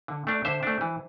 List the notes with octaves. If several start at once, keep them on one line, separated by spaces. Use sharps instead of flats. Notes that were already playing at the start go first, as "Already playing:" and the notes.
D3
A3 D4
D3 C5 E5
A3 D4
E3